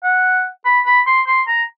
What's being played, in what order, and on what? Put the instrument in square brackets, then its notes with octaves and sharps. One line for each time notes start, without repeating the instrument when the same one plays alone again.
[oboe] F#5
B5
B5
C6
C6
A#5